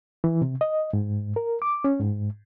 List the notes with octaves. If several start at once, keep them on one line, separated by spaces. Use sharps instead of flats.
E3
C3
D#5
G#2
A#4
D6
C#4
G#2